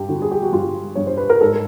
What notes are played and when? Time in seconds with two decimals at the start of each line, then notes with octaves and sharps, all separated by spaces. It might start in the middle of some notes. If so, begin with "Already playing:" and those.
Already playing: G2 G4
0.09 D3 F#4
0.22 G#4
0.31 G4
0.43 F#4
0.52 G2 F4
0.95 G2 C#5
1.07 C5
1.17 B4
1.30 A#4
1.41 G#2 A4